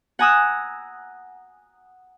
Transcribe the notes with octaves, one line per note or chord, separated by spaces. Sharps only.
F#5 G#5 A#5 D#6 E6 F#6